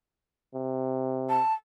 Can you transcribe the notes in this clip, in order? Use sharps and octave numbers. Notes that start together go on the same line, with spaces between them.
C3
A5